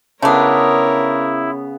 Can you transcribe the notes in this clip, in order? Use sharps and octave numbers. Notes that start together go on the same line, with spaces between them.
C#3 A3 B3 D4 E4 A#4 C#5